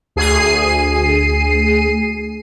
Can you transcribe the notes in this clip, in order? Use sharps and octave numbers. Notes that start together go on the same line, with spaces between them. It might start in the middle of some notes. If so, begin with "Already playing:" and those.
D2 G#4 C7 D#7